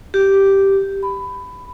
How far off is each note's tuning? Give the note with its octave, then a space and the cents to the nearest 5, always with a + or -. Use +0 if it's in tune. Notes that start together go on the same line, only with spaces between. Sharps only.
G4 -5
B5 +15